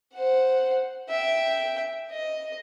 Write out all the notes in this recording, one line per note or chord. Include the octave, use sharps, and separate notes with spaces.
C5 F#5
E5 G5
D#5